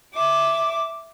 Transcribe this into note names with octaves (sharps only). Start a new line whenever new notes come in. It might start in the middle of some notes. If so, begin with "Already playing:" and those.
E5 D6